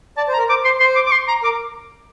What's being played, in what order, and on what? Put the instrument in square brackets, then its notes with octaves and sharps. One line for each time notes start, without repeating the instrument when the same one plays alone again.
[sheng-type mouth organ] D5 [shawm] A5
[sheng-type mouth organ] C5
[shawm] A#5
[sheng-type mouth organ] A#4
[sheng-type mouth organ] C5 [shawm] D6
[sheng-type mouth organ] C5 [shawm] C6
[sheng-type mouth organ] C5 [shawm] C6
[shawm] D6
D6
C6
A#5
[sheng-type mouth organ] A#4 [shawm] D6